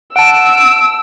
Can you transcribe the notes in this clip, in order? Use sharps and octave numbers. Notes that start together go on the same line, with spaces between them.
F#5 A5 E6 D7